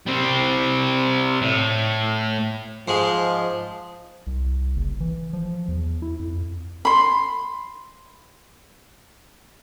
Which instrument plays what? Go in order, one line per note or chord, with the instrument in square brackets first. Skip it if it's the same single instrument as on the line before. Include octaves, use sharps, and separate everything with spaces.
[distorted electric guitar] G3 C4
A2
[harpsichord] G#2 G#3 [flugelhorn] F3
[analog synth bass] C2
F#1
E3
F3
E2
E4
F2
[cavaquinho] B5 C6